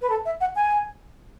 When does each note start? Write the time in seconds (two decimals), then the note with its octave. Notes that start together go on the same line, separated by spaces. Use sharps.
0.02 B4
0.10 A4
0.25 E5
0.41 F#5
0.56 G#5